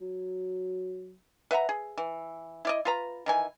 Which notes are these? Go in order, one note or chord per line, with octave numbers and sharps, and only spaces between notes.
F#3
B4 E5 F#5 A#5
G#4
E3
E4 D5 D#5
F4 B4 A#5
D#3 E3 G#5